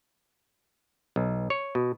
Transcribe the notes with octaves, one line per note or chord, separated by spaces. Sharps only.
B1
C#5
B2